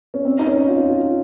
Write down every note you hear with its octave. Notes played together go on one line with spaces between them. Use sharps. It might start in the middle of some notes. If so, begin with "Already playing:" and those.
C#4
C4
D#4
C#4
F4
F4